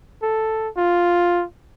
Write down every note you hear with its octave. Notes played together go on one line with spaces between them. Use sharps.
A4
F4